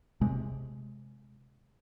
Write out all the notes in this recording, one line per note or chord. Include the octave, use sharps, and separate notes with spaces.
C3 G#3